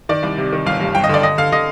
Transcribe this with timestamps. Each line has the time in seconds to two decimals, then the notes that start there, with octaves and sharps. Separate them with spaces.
0.09 D#3 D5
0.23 C2
0.38 C3
0.52 D#3
0.66 G1 F5
0.80 G2
0.95 G1 G5
1.04 D#5
1.09 D3 D5
1.23 D3 D#5
1.38 D3 F5
1.52 D3 D#5